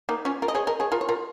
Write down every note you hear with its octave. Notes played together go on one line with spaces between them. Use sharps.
A#3 D#4
C#4 F4
F4 A#4
D#5
G#4 C#5
A#4 D#5
G#4 C#5
F4 A#4
C#5
F4 A#4